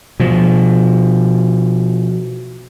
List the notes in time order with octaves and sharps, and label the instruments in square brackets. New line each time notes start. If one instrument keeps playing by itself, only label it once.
[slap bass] B2 F3